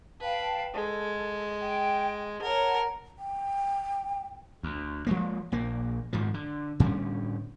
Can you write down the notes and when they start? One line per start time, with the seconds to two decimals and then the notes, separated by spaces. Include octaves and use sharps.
0.21 B4 F5 G5 A5
0.74 G#3 A4
1.61 G5
2.42 A#4 C#5 F#5 A5
3.18 G5
4.63 D2
5.07 F3 G#3 A#3
5.52 A#1 A#3
6.13 G#2 D#3 F3
6.34 D3
6.80 A2 D3 G3 C#4